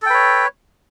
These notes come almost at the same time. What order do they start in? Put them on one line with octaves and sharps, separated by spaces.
A4 G5 B4 C#5